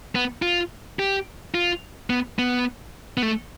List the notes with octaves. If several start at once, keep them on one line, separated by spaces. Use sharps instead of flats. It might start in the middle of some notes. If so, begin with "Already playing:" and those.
B3
F4
G4
F4
B3
B3
B3
A3